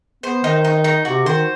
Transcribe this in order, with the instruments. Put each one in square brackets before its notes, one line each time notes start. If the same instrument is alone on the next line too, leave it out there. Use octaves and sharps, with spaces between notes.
[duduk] B3 [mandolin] C5
[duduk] D#3 [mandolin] D#4
[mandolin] D#4
D#4
[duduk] C3 [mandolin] F#4
[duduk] D#3 [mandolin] C5